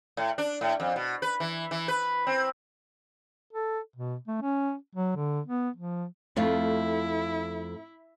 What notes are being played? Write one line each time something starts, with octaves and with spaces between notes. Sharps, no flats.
A2
D4
A2
F2
B2
B4
E3
E3
B4
C4
A4
B2
A3
C#4
F#3
D3
B3
F3
F2 A3 E4 F4